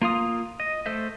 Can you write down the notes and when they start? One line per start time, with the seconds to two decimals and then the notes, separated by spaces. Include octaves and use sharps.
0.02 A#3 F4 F5 D#6
0.60 D#5
0.86 A3 A4 C5 E5